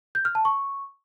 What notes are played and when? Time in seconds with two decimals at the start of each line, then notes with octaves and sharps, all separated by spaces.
0.15 G6
0.25 F6
0.35 A5
0.45 C#6